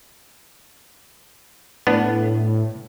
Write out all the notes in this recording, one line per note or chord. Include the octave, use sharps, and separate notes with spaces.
A2 B3 D4